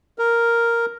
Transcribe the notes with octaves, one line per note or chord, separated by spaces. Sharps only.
A#4